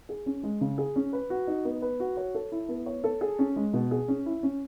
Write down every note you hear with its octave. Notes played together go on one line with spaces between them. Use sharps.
G#4
C#4
G#3
C#3
G#4
C#4
B4
F#4
D#4
B3
B4
F#4
C#5
A4
E4
B3
C#5
A4
G#4
C#4
G#3
B2
G#4
C#4
E4
C#4